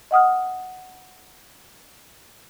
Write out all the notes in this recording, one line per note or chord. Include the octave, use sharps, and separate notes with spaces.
D#5 F#5 D#6 F6